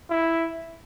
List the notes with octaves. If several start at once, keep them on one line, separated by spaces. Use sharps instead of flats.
E4